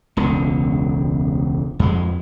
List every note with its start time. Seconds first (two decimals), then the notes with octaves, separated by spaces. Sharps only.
0.17 E1 C#2 D3
1.79 F2 G#3